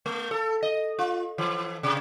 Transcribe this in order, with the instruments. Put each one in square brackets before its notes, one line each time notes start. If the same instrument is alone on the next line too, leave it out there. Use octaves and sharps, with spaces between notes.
[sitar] A3
A4
D#5
F4
E3
C3